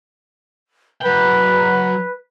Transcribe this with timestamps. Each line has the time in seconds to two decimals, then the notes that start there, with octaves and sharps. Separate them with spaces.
1.01 F#3 B4 G5